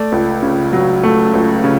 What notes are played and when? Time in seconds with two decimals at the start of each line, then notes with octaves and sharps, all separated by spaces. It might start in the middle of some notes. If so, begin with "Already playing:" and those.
Already playing: A3 D5
0.12 C#2
0.43 C#3
0.73 F#3
1.03 A3
1.34 C#2
1.64 C#3